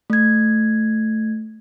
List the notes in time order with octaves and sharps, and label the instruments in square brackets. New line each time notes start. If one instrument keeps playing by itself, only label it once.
[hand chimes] A3 G#6